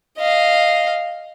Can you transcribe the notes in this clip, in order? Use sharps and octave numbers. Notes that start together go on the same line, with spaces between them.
D#5 F5